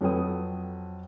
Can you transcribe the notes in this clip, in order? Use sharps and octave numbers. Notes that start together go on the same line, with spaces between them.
F2 F#3 A4 B4 G5 D#6